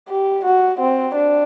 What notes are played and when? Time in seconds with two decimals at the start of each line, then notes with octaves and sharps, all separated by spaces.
0.09 G4
0.44 F#4
0.80 C4
1.15 D4